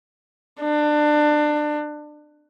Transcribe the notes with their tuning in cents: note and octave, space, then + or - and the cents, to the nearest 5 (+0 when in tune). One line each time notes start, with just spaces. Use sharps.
D4 +25